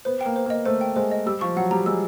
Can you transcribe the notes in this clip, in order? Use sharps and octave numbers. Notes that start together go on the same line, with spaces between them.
B3 C5
A#3 G5
C5
A#3
D#5
A3 C5
G5
G#3 C5
D#5
G3 E6
F3 C#6
F#3 F#5
G3 A#5
G#3 E6